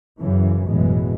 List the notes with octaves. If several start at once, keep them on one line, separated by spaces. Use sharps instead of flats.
F#2 C#3 E3
A1 F#2 B2 E3 G#3